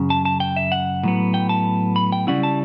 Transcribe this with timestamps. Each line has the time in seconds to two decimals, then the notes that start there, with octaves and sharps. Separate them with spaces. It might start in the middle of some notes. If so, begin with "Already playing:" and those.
Already playing: F#2 C#3
0.10 A5
0.25 A5
0.40 G5
0.57 E5
0.72 F#5
1.03 A2 F#3 B3
1.34 G5
1.49 A5
1.96 B5
2.12 G5
2.27 C#3 G3 C#4 E4 F#5
2.43 A5